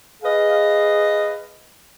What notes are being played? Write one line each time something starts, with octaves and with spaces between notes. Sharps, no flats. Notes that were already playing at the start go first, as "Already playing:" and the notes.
G#4 B4 D#5 F5